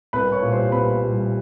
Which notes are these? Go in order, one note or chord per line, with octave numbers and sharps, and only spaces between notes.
C2 B4 B5
C#5 C#6
A#2 G3
C5 C6
C2 B4 B5
A#2 G3